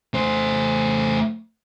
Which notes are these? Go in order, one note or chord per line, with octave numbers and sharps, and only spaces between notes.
A3 C5